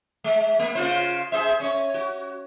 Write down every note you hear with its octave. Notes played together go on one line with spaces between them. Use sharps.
G#3
A#3
C#3 F4 C5
G#4 C5 E5
C#4 C#5
F#4